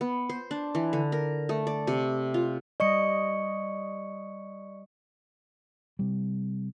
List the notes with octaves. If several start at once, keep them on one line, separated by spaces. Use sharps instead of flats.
B3
C5
D4
E3
D3
A#4
A3
D5
C3
F4
G3 D5 D#5 C#6 C#7
C3 G3